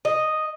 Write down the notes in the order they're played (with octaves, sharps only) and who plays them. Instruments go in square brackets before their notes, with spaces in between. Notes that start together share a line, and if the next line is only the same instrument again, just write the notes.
[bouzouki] D#5